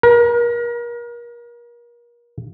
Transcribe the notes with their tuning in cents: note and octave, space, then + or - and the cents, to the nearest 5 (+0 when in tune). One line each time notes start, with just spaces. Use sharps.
A#4 +35